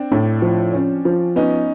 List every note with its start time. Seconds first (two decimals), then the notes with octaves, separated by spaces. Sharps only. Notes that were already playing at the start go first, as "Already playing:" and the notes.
Already playing: C4 D4
0.12 A2
0.42 F3
0.73 C#4
1.05 F3
1.36 B3 C#4 D#4